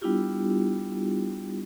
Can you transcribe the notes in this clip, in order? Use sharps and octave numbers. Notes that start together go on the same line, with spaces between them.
G3 B3 D4 E4 F4 G4